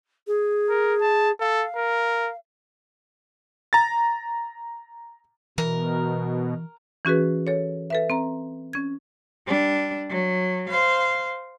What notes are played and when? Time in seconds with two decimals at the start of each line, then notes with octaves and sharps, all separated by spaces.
0.27 G#4
0.69 A#4
1.01 A5
1.40 A4 F5
1.76 A#4
3.73 A#5 A6
5.58 B2 E3 A#4
7.05 E3 C#4 F#4 G#4 B4
7.47 A4 C#5
7.90 A4 B4 E5
8.10 C4 A#5
8.73 C#4 G#6
9.47 G3 D4
10.09 F#3
10.69 C5 F5